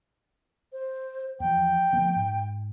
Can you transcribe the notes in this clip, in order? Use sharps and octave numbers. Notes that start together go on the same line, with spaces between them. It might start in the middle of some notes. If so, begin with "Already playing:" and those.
C5
E2 F3 G5
D2 F3 B3
G#2